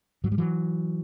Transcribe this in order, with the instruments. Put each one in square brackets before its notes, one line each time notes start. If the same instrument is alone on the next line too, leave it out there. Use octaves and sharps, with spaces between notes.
[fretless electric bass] G#2 F#3
G3
E3 F#3